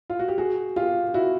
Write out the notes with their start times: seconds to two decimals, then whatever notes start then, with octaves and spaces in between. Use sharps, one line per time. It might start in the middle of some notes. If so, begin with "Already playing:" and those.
0.10 F4
0.19 F#4
0.28 G4
0.38 F#4 G#4
0.76 F4 G4
1.14 E4 F#4